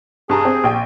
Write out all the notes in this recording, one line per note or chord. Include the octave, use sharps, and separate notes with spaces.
G2 G#4 A5 A#5
C4
A#1 G5